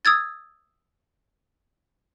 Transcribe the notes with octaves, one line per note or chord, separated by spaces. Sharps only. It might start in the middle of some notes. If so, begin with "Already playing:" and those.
D#6 E6 G#6 A6